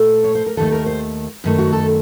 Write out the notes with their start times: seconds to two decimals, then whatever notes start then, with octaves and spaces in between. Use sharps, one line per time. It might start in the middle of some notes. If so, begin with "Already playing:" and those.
Already playing: A#2 A3 A4
0.24 C#5
0.35 C5
0.46 A#4
0.57 D#2 D#3 A3 A4
0.72 A#4
0.86 C5
1.44 F#2 D#3 A3
1.58 F#4
1.73 A4